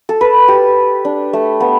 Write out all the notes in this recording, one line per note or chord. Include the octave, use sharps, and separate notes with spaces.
A4
B4
G4
D4
A3
B3